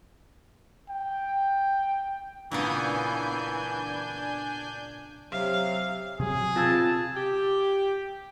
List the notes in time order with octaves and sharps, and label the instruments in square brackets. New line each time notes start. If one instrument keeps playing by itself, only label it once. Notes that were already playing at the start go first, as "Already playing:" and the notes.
[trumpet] G5
[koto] A#2 C#3 B3 [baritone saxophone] E3 [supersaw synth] D4 G#5 G6
[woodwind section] C3 F#3 [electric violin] F5
[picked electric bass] C3 F#3 [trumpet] G#4
[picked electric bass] C3 C4 [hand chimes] F4 E6 G#6 [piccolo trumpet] A5
[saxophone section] G4